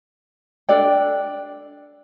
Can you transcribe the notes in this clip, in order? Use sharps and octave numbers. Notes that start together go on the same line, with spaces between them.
D4 A4 D5 G5